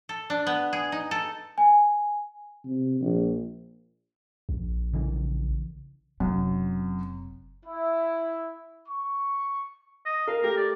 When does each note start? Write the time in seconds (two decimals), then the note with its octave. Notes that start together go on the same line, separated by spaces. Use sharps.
0.09 A4
0.30 D4
0.47 B3
0.73 G#4
0.92 D#4
1.11 A4
1.58 G#5
2.65 C3
3.01 A#1
4.49 A#1
4.93 C#3 E3
6.20 F#1 F#2 C3
7.65 E4
8.87 C#6
10.05 D#5
10.27 A#4 F5
10.42 A3 G4 A#4
10.57 D5